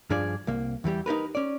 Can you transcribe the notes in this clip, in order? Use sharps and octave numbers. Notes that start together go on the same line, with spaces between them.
G2 F3 D4 F4 G#4 D5
C2 A#3
E2 E3 G3 G4
D#4 G4 A#4 B4
C#4 D5